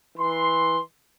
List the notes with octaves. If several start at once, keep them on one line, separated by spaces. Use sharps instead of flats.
E3 C6